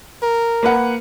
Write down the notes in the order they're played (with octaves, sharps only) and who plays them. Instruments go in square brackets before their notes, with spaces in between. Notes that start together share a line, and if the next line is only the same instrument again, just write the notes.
[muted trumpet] A#4
[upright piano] A#3 B4 F#5